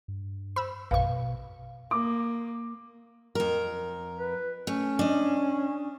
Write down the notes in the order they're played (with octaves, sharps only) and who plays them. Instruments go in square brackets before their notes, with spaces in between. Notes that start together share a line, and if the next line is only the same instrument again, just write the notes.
[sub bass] G2
[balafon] C5 [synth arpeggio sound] B5 E6
[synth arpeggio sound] A#1 F#2 C#6 [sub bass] B2 [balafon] B4 F5
[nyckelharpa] A#3 [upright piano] D6
[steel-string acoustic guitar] F2 A#4
[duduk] B4
[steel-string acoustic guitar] A3 [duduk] C#4
[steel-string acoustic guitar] D4 D#5